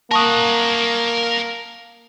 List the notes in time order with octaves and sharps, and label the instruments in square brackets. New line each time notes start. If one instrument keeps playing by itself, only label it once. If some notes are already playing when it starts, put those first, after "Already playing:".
[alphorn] A#3 [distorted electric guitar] A#4 F#5 [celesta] A5 C#6 D#6